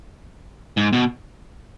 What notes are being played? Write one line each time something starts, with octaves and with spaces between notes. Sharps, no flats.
G#2
B2